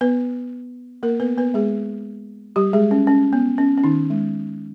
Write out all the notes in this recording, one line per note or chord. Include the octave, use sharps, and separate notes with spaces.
B3 B4
A#3 A#4
B3 B4
B3 B4
G#3 G#4
G3 G4
G#3 G#4
C#4
C#4
B3
C#4
C#4
D#3 D#4
G#3